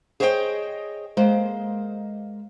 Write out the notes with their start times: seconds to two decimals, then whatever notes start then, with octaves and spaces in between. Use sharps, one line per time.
0.20 G#4 C5 C#5 D#5 E5 G5
1.17 G#3 A#3 C5